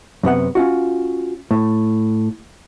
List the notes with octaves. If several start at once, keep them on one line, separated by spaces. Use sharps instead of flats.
F#2 C3 B3 F#5
C#4 F4 F#4
A2